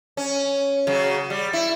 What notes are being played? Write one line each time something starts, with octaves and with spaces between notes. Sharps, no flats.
C#4
C#3 F#3
G3
E4